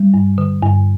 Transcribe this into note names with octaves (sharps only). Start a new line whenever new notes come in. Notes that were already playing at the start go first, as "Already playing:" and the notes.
Already playing: G3
G2
D3
G2